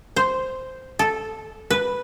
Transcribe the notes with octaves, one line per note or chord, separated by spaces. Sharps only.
C5
A4
B4